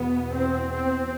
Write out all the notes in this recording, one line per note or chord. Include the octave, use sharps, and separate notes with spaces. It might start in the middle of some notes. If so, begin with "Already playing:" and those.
Already playing: E2 B2 B3
C4
C4